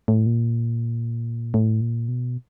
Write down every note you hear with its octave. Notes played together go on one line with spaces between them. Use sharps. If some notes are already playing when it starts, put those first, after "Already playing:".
A2
A#2
A2
A#2
B2